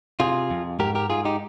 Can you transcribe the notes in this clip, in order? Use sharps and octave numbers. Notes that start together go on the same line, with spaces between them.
C3 F4 G#4
F2
G#2 G4 A#4
G4 A#4
G#2 F4 G#4
D#4 G4